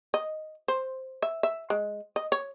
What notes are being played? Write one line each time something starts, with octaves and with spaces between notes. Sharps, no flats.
D#5
C5
E5
E5
G#3
D#5
C#5